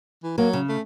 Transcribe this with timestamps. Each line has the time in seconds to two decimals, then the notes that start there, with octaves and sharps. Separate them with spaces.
0.23 E3
0.38 F#3 A#3
0.53 C#3
0.69 A3